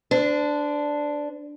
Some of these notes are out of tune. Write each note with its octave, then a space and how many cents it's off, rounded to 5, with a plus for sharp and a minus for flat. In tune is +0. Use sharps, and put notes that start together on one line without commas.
D4 +0 C5 -35